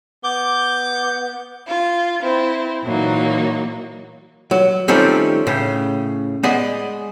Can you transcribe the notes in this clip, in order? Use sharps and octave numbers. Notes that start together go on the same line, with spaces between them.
B3 D6 G6
F4
C4 E4
A#2 E3 F#3 A#3 D#4
F#3
D#3 F3 G3 A3 C4 C#4
A2 C#3
G#3 B3 G#4 D5 D#5